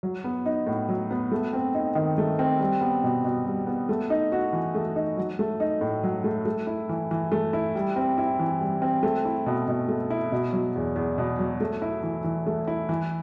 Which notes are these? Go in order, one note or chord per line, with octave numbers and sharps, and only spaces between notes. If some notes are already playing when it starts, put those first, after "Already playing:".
F#3
B3
D#4
A2
F#3
B3
A3
C4
D#4
D#3
A3
C4
G3
B3
B2
B2
G3
B3
A3
D#4
F#4
E3
A3
D#4
F#3
A3
D#4
A2
F#3
A3
A3
E4
E3
E3
A3
E4
G3
C4
E4
E3
G3
C4
A3
E4
B2
B2
A3
E4
B2
F#3
E2
E2
B2
F#3
A3
E4
E3
E3
A3
E4
E3